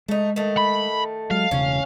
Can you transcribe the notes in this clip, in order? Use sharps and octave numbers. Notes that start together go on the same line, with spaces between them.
G#3 A3 D#4
D#3 A3
B5
F#3 G#3 F5
E1 C#3 C#4